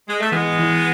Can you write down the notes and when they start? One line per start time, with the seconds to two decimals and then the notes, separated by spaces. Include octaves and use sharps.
0.08 G#3
0.20 A3
0.31 E3 G#3 B3
0.59 E3